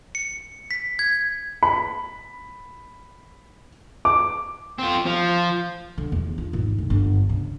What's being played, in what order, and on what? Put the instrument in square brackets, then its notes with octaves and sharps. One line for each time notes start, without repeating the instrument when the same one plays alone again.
[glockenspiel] C#7
B6
G#6
[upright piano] B5
D6
[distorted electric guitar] C4 F4
F3
[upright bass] D3
E2
F4
G#1
F1
G1
C#3